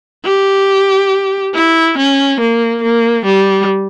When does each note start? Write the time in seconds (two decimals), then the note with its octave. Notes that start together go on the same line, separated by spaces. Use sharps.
0.25 G4
1.54 E4
1.98 C#4
2.40 A#3
2.83 A#3
3.25 G3